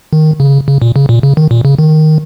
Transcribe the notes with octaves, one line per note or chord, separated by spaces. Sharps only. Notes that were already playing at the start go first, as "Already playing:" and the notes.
D#3
C#3
C#3
A#2
C#3
A#2
C#3
D#3
A#2
C#3
D#3